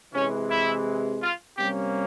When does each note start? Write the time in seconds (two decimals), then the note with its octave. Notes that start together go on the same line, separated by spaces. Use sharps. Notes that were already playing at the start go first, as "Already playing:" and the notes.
0.13 C3 E3 G#3 C#4
0.50 E4
1.21 F4
1.57 C3 G3 A#3 C#4 G4